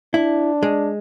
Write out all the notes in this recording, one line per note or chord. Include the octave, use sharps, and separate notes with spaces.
D4 E4
G#3